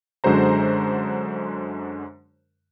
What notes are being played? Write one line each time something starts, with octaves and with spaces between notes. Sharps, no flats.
F#2 D3 G#3 F#4 C5 A#5